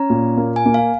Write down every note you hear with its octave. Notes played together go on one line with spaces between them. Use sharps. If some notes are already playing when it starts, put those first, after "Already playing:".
Already playing: C#4 A#5
A#2
A#3
G#5
A#3
F5